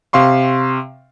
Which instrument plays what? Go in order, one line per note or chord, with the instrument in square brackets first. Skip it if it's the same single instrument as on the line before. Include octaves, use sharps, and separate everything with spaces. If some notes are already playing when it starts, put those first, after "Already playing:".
[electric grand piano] C3 F5 C6 C#6